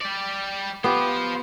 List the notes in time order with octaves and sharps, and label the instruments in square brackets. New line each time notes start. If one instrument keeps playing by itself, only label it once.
[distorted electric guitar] G3 D5
[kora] B3 G4 [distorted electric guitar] F4 C5